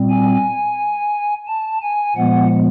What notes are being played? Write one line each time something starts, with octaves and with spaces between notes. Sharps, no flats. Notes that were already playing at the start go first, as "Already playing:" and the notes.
Already playing: A#2 G3 C4
G#5
A5
G#5
A#2 F3 G#3 B3 F#5